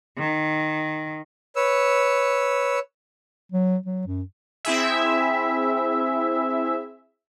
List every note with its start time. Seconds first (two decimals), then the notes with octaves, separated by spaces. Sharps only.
0.18 D#3
1.56 B4 C#5 E6
3.52 F#3
3.86 F#3
4.07 F#2
4.65 C4 E4 G#4 E5